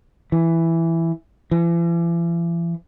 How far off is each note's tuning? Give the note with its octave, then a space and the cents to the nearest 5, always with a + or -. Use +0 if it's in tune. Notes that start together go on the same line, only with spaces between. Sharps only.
E3 +5
E3 +40